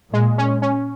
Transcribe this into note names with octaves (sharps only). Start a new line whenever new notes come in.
A#2 G#3
C#4
C#4